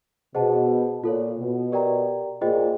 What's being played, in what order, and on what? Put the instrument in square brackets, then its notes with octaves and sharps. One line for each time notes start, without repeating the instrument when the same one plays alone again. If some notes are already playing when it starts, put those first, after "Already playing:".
[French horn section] B2 [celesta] G#4 C5 D#5 F#5 A5
[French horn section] A#2 [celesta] F4 A4 C#5
[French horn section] B2
[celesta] G4 A#4 D5 G5 A#5
[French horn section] A#2 [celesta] F4 G#4 C5 D#5 G5